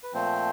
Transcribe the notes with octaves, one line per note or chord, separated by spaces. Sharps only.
B4
A#2 F3 A3 C4 C5